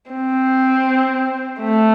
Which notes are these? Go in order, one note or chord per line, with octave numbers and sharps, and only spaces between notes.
C4
A3